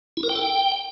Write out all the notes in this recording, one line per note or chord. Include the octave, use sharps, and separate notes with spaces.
E4
A#4
G5
A4
G5